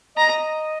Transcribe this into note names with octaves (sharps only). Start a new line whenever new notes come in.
D#5 A#5